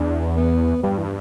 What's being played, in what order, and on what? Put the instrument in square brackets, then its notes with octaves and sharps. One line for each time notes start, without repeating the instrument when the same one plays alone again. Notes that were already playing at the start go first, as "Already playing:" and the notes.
Already playing: [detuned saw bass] E2 [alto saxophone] D4
[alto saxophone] B3
[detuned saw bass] G2 [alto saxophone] G3
[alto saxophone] E3